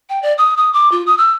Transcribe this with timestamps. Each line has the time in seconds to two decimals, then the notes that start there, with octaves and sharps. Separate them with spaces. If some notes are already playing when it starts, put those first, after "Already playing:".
0.09 G5
0.22 D5
0.38 D#6
0.57 D#6
0.73 D6
0.92 F4
1.07 D#6
1.18 E6